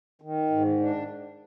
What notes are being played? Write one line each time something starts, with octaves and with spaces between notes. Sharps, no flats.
D#3
G#2
D4